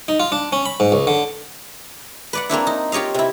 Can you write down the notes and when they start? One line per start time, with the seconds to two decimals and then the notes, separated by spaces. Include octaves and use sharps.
0.08 D#4
0.20 F4
0.32 D4
0.53 C#4
0.66 B5
0.80 G#2
0.92 C#2
1.07 D3
2.33 B4 D5 F#5
2.49 A#3 C4 D4 E4
2.67 D#4
2.92 F4 G4 C#5 D#5 F5
3.14 C3 E4